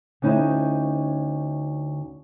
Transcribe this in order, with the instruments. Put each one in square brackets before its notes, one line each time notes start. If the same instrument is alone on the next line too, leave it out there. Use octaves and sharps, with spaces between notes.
[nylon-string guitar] D2 C#4 D#4 E4 C5